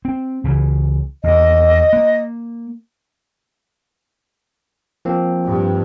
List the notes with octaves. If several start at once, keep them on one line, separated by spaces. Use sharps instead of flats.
C4
C#2 C#3 E3
E2 D#3 D#5
A#3
F3 A#3 C4
G2